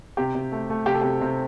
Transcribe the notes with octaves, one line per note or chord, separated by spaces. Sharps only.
C3 G4
C3
A3
A3
C3 G4
A4
C3 G4
C3